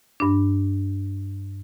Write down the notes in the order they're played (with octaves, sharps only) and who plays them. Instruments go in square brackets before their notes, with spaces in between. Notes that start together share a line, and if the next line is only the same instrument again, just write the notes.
[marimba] G2 D4